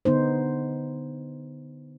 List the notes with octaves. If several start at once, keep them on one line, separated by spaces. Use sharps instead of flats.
D3 B3 D#4 C5